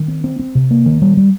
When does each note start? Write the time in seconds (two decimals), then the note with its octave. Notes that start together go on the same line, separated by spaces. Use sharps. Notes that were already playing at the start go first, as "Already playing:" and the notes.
Already playing: D#3
0.08 C4
0.24 C4
0.39 C4
0.55 C3
0.71 A#3
0.86 D#3
1.02 G3
1.17 G3